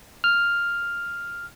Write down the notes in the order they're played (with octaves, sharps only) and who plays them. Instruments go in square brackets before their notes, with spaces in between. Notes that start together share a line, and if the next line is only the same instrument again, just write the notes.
[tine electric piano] F6